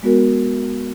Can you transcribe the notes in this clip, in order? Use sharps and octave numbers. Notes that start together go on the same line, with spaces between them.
G#3 B3 F#4 A#4